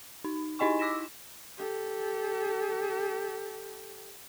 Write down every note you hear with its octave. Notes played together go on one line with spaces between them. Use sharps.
D#4
D#4 E4 D#5 G#5 C#6
D6 E6 A#6 B6 E7
G4 A4